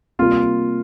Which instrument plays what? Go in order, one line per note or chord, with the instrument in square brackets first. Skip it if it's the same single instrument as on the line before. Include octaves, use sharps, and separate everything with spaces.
[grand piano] C3 G3 A#3 F4